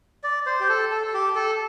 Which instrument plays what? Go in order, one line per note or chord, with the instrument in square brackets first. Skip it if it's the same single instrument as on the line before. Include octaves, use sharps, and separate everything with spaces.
[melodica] D5
C5
G4
A4
A4
A4
G4
A4